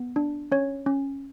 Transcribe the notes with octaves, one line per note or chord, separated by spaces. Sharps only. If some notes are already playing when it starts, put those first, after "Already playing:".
Already playing: B3
D4
C#4 C#5
C#4